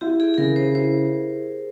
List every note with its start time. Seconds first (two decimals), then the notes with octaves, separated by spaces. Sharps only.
0.01 E4 G4
0.20 G#4
0.34 G#4
0.38 C#3 A#4
0.56 C5
0.74 E4 C5